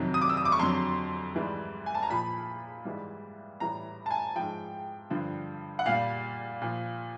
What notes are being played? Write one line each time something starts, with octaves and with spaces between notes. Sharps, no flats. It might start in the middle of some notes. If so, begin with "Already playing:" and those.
Already playing: F2 C3 D#3 F#3
D#6
D6
E6
D#6
D6
C#6
F2 D3 F#3 C6
G#2 E3 G3
G#5
A5
A#5
A#2 F3 B5
G#2 E3 G3
A2 E3 G3 A#5
A5
G#5
G#2 F3 G5
G2 D3 F3
F#5
A#2 G3 F5
A#2 F3